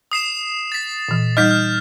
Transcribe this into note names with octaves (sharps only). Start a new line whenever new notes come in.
D#6 C7 E7
A6 B6
A#2 E3
G3 D#4 D#5 F6 G6 B6
F6